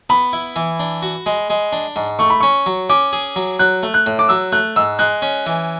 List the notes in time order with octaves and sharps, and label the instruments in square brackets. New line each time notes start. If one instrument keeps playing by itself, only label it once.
[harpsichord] B3 [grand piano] B5
[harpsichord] E4
E3
D4
F#4
G#3
G#3
D4
G#2
[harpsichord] A3 [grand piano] C#6
[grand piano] B5
[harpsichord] C#4 [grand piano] C#6
[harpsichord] F#3
[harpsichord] C#4 [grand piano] D6
[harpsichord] G#4
F#3
[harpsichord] F#3 [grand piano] F#6
[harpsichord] A3
[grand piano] F#6
[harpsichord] A2
[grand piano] D6
[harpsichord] F#3 [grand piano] E6
[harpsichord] A3 [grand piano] F#6
[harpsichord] G#2 [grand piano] E6
[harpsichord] G#3 [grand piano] F#6
[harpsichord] C#4
E3